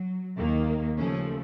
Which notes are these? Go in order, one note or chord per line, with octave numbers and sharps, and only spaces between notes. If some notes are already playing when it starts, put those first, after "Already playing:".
Already playing: F#3
D#2 D#3 A#3
D#2 C#3 F3 A3 C#4